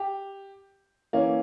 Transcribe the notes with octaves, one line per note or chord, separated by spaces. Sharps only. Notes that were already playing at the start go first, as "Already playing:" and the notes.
Already playing: G4
E3 A#3 C#4